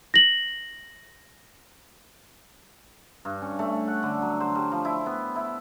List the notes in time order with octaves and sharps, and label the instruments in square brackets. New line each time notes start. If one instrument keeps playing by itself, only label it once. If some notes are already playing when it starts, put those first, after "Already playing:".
[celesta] A#6 F#7
[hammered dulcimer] G2
C#4
A3
F#5
D3
F#3
C5
G3
F3
E4
B3
E4